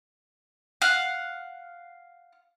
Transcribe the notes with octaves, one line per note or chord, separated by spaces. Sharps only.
F5 F#5